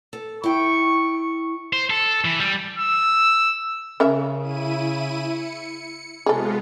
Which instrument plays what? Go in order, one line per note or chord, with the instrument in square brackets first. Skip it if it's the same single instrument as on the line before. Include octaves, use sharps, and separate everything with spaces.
[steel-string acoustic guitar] A4
[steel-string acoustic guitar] E4 G5 [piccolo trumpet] C#6
[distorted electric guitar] C5
A4
E3
G3
[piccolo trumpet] E6
[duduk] C#3 [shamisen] C#4 A#4 E5
[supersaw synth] E4 D#7
C#7
[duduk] C3 [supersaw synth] G#3 B3 F4 [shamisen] G#4 A4